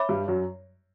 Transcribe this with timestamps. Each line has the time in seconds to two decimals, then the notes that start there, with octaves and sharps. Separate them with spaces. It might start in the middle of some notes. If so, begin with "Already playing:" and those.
Already playing: C#5 E5 B5 D6
0.09 G2 G3
0.28 F#2 F#3